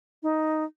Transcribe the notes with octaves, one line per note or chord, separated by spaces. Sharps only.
D#4